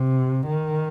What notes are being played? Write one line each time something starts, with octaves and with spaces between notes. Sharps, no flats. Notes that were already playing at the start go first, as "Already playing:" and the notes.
Already playing: C3
D#3